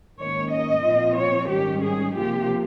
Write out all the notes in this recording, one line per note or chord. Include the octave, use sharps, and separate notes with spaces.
G#2 D#3 A#3 C#4 C#5
D#5
A#2 F3 C4 F4
C#5
G#2 D#3 G3 C#4 G4
G#4
C3 F3 A#3 F4 G4